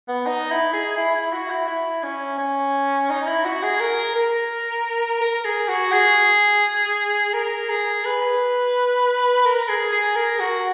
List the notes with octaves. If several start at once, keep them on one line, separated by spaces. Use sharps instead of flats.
B3
D#4
E4
G#4
E4
E4
F#4
E4
E4
C#4
C#4
D#4
E4
F#4
G#4
A#4
A#4
A#4
G#4
F#4
G#4
A#4
G#4
B4
A#4
G#4
G#4
A#4
F#4